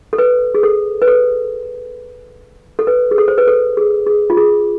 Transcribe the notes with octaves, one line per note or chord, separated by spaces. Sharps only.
A4
B4
G#4
A4
B4
A4
A4
B4
G#4
A4
C5
B4
A4
G#4
G#4
F4
G#4